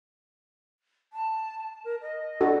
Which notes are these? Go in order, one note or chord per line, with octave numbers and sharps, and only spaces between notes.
A5
A5
A#4
D#5
D4 F#4 A4